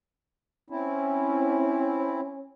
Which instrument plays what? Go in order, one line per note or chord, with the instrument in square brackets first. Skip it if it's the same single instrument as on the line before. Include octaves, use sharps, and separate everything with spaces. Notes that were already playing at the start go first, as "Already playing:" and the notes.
[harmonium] C4 E4 [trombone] C#4